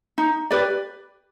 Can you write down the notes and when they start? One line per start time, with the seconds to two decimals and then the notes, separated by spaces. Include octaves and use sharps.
0.18 D#4
0.51 G4 B4 D5